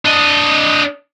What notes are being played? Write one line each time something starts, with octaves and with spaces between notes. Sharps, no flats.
D4 D#5